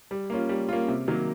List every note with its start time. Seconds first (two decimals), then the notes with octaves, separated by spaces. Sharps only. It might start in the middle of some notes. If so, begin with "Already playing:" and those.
0.11 G3
0.30 A#3 C#4 F4
0.49 G3
0.69 A#3 C#4 F4
0.88 C3
1.08 D#3 F#3 A#3